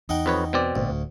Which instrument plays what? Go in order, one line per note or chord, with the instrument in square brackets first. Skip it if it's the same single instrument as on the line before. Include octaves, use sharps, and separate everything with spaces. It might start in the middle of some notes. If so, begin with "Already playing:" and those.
[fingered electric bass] E2 [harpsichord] D#4 F#5 G5
[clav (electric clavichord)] F2 B4 C#5
B2 C4 D5
[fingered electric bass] G#1 A#2 [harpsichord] D2
[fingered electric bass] D1